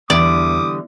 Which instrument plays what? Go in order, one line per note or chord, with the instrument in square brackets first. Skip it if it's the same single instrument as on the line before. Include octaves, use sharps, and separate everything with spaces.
[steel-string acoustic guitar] E2 [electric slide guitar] D3 E3 G3 [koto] D5 [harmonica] D6 D#6